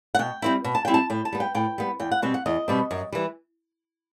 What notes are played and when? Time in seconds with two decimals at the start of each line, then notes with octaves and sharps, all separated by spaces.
0.15 F#5
0.19 B2 G5
0.42 G3 C4 E4
0.64 B2
0.75 A5
0.85 G3 C4 E4 G5
0.94 A5
1.10 A2 G5
1.25 A5
1.32 G3 B3
1.40 G5
1.55 A2 G5
1.78 G3 B3
2.00 E2 G5
2.12 F#5
2.22 B2 G3 C4 G5
2.34 F#5
2.46 E2 D#5
2.68 B2 G3 C4
2.91 F#2
3.12 E3 G3